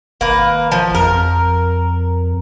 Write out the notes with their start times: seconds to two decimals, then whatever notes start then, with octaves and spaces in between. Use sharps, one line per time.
0.21 G#1 A#3 B4
0.72 F3
0.95 F2 A#4